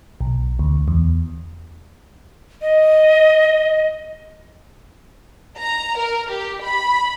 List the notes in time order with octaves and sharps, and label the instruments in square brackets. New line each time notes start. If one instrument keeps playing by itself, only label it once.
[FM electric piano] B1
D2
E2
[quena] D#5
[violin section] A#5
A#4
G4
B5